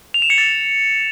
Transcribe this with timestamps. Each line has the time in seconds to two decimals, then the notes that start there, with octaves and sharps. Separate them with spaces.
0.14 F7
0.22 E7
0.30 C#7
0.38 A6